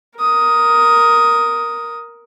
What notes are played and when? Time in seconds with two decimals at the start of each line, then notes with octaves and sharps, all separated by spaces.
0.18 A#4 D#6